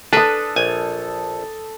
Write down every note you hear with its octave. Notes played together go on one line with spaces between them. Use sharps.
D4 A4 B4 D#6
A#1 G#5